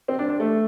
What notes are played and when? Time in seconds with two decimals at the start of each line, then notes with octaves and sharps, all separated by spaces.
0.08 C4
0.19 D4
0.29 D4
0.40 A3